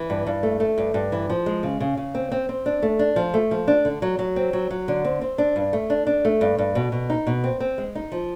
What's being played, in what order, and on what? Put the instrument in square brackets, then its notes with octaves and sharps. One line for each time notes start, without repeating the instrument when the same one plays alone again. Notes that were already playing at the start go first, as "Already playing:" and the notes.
Already playing: [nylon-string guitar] E3
G2
G2
A3
A3
G2
G2
E3
F3
G#3
C#3
C#3
C#3
C4
C4
C4
D4
A3
D4
F3
A3
F3
D4
D3
F#3
F#3
C4
F#3
F#3
D3
C4
C4
D4
G2
A3
D4
D4
A3
G2
G2
B2
B2
D#4
B2
C4
C4
G#3
D#4
F3